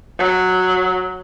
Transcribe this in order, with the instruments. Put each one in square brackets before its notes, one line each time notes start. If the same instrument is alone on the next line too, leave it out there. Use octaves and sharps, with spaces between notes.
[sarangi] F#3